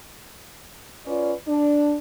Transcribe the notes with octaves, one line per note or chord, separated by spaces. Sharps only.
C#4 F4 B4 D5
D4